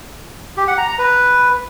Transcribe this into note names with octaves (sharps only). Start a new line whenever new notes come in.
G4
F#5
A#5
A#5
B4